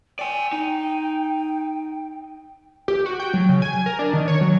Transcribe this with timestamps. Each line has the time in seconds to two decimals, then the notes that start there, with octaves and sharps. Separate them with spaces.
0.19 D5 G5 G#5
0.53 D#4
2.88 G4
3.06 F#4
3.20 G5
3.34 F#3
3.49 C#3
3.62 G#5
3.86 A#4
3.99 D4
4.13 D#3
4.28 C#5
4.41 F#3